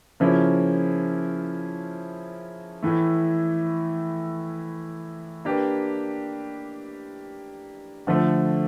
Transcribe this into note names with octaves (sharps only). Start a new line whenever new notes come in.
C#3 F3 A#3 C#4 E4
A2 E3 A3
A#3 D4 G4 B4
D3 F3 A3